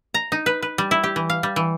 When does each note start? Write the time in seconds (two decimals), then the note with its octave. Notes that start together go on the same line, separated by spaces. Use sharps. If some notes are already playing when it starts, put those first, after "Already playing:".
0.14 A#5
0.32 D#4
0.46 B4
0.62 B4
0.78 G3
0.91 E4
1.04 G4
1.16 E3
1.30 F5
1.43 G3
1.56 E3